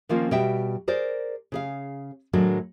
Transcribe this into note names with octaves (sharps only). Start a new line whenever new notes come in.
D#3 F3 A#3 C4 C#4 F4
B2 G3 E5 G5
G#4 A#4 C5 D5
C#3 G#4 F5
A2 D#3 F#3 G#3 D4 A#4